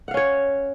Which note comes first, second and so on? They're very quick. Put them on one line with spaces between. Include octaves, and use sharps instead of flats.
F#5 F5 C#4 C#5